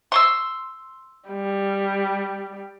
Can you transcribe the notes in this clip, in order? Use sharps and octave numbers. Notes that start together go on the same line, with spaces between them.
C6 C#6 E6
G3